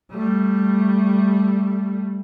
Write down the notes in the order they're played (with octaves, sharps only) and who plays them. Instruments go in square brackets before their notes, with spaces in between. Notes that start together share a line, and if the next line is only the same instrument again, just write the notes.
[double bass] G3 A3